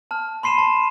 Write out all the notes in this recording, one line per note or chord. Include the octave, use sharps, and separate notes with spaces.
A5 F6
B5 C6 C7 D#7 E7
A5